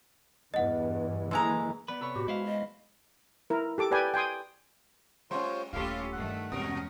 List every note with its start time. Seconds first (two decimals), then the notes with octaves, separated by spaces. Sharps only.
0.54 E2 G2 D#5 F#5
1.31 F#2 D3 E3 G#3 A#3 A#5
1.88 B3 B4 D5
2.01 C3 A4 C#5 B5 C#6
2.16 A2 F#4 G4
2.28 G#3 E4 C5 F5
2.46 D#5
3.50 E4 A#4
3.78 G4 A4 D6
3.91 G4 B4 D5 G5 G#5
4.14 G5 G#5 C6 D#6
5.31 G3 C#4 F4 C5 C#5
5.73 D#1 D2 C#4 E4 F4 G4 A4 F5
6.13 G2 D#3 A3 F#5
6.52 E2 B2 G#3 C#4 F#4 A#4 D#6